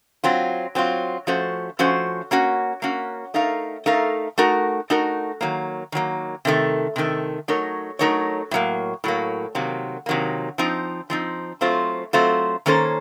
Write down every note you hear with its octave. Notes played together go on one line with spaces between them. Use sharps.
F#3 C4 F4
F#3 C4 F4
F3 A3 C#4 F#4 C5
F3 A3 C#4 F#4 C5
A#3 C#4 F#4
A#3 C#4 F#4
A3 D#4 A#4 F5
A3 D#4 A#4 F5
A3 D#4 F#4 A#4
A3 D#4 F#4 A#4
D#3 F#3 A#3
D#3 F#3 A#3
C3 D#3 A3
C3 D#3 A3
F#3 A3 D#4 A#4 C#5
F#3 A3 D#4 A#4 C#5
A2 F#3 A#3
A2 F#3 A#3
C3 D#3 F#3 A#3
C3 D#3 F#3 A#3
F3 C4 D#4
F3 C4 D#4
F#3 A3 C4 F4 C5
F#3 A3 C4 F4 C5
D#3 A#3 C#4 A4 C5